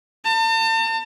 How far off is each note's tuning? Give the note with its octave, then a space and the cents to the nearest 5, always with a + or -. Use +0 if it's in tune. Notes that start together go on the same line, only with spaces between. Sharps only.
A5 +40